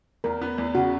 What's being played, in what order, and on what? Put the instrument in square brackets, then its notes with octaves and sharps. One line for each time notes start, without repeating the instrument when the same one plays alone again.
[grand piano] E2 [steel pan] A#4
[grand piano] B3
E2
[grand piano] C#3 [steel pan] F#4